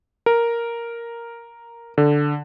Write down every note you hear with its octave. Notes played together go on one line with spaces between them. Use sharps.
A#4
D3